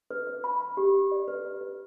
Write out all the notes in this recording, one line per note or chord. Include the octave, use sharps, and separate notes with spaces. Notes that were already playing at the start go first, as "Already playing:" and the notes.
B4
B4
B5
B5
G4
G4
D5
B4
B4
B4